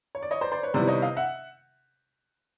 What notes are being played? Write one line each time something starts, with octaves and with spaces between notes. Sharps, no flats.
C#5
D5
C#5 D#5
C5 D5
C5 D5
B4 C#5
C3 D#3 G3 B3 E4 C5 D5
C#5 D#5
D#5 F5
E5 F#5